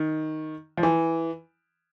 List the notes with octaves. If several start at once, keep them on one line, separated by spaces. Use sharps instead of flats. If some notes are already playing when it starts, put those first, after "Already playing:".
Already playing: D#3
F3
E3